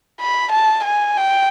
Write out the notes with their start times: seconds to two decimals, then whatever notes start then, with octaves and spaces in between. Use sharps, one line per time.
0.21 B5
0.52 A5
0.85 G#5
1.17 G5